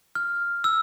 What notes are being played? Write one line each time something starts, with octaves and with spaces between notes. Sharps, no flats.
F6
E6